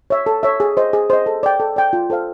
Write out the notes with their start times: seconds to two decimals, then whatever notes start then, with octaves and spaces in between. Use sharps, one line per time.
0.10 C#5 E5
0.26 A4
0.43 C#5 E5
0.60 G#4
0.77 C5 D#5
0.93 G#4
1.10 C5 D#5
1.26 A4
1.43 D5 G5
1.60 A4
1.76 D5 G5
1.93 F4
2.10 A4 C5 F5